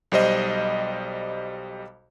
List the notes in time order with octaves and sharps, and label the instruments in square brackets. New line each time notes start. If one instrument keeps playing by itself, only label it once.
[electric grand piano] B1 G3 C5 D#5